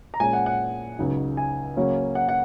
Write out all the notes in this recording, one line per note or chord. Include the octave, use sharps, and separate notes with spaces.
A#5
A#2 G#3 C#4 G#5
F#5
F#5
C#2 C#3 F#3 D#4
G#5
C#3 F#3 A#3 C#4
F#5
F#5